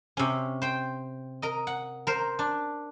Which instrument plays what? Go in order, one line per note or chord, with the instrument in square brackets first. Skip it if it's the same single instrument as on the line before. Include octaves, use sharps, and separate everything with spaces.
[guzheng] C3 C#4
C5 G5
A#4 D#5
F#5
A#4 C5
D4